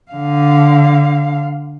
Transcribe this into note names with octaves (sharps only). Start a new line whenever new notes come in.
D3 F5